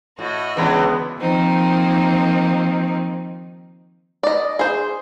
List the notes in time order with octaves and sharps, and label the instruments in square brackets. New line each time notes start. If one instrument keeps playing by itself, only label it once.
[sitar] A2 [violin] F#4 D#5
[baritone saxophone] C#2 [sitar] D3 E3 [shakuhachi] B3
[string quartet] D#3 F3 A#3 C4 D#4
[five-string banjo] D5 D#5
G#4 C5